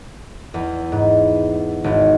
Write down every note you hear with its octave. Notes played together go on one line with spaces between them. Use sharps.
E2
G#2
G#1